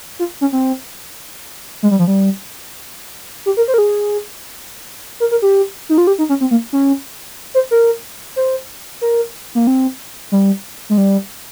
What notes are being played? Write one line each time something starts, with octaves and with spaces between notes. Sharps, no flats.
F4
C#4
C4
G#3
G3
F3
G3
G4
A#4
C5
A#4
G#4
A#4
A#4
G4
D#4
F4
G4
D#4
C#4
C4
A#3
C#4
C5
A#4
C5
A#4
A#3
C4
G3
G#3
G3